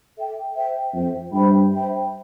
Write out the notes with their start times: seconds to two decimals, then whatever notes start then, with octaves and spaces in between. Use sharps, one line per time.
0.17 A4 E5 G5
0.55 C5 E5 G5
0.94 F2 C5 E5 G5
1.32 G2 C5 E5 G5 B5
1.72 C5 E5 G5 B5